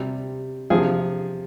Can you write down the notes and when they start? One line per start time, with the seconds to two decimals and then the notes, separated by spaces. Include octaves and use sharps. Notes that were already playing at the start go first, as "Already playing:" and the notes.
Already playing: C3 G3
0.70 C3 F3 G#4